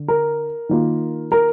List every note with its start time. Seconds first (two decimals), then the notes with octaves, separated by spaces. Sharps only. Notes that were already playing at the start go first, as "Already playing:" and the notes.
Already playing: D3
0.08 A#4
0.69 D#3 A#3 F4
1.32 A#4